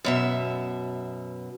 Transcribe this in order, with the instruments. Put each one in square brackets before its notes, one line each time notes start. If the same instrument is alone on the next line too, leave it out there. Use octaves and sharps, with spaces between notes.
[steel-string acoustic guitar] F#2 B2 E5